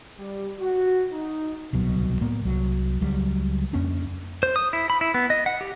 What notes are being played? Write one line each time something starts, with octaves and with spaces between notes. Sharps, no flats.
G3
F#4
D#4
D1 C2 B2 F#3
A2 A#3 B3
C2 F#3
C#2 F#3 G3
F2 A#3 C#4 D4
C5
D#6
E4
B5
E4
B3
D#5
F#5
G4